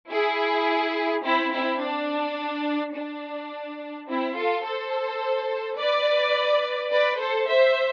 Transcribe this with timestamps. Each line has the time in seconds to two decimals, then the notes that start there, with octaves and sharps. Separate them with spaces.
0.12 E4 G#4
1.25 C4 E4
1.53 C4 E4
1.82 D4
2.96 D4
4.09 C4 E4
4.37 F4 A4
4.65 A4 C5
5.79 B4 D5
6.93 B4 D5
7.21 A4 C5
7.49 C5 E5